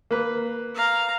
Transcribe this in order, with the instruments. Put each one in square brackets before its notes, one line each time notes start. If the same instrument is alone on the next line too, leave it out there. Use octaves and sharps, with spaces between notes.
[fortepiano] A#3 B4
[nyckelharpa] F5 A#5